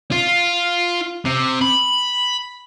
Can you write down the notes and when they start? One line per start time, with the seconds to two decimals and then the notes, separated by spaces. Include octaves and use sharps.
0.11 F4
1.25 C3
1.61 B5